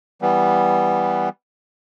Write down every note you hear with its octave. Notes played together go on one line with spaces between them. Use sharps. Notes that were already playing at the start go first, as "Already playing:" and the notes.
E3 G3 B3